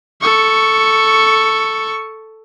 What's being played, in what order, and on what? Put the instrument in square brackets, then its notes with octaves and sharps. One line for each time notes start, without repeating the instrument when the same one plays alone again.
[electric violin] A4 C#6